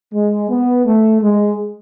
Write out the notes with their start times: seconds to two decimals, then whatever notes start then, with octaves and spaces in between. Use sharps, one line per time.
0.14 G#3
0.50 B3
0.85 A3
1.22 G#3